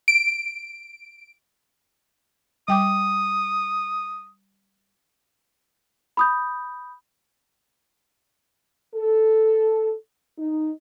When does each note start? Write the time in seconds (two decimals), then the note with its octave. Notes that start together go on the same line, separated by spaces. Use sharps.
0.08 D7
2.68 G3 G5 D6 D#6
6.17 B5 D#6 G6
8.95 A4
10.38 D#4